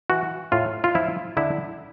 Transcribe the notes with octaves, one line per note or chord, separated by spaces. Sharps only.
E3 F#4
A2 F4
F4
F3 E4
D3 E4